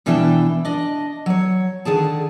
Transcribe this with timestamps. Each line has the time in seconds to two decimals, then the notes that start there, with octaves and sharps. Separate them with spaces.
0.06 E2 B2 E3 D4 E5 G5
0.65 D4 D#5
1.26 F#3 C#5
1.85 D3 D#3 G#4 A5